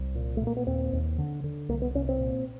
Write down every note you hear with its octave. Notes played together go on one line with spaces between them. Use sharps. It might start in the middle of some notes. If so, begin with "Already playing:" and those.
Already playing: C2
A#2
A3
A#2
A#3
B3
D#2 C4
D#2
D3
D3
C2 A#3
B3
C2 C#4
C4
A#2